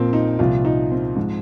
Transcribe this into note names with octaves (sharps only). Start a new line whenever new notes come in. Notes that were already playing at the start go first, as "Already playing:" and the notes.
Already playing: A#1 A#2 F3 A#3 C4
D#4
C2 A#2 F3 F4
D#4
C4
G#2 F3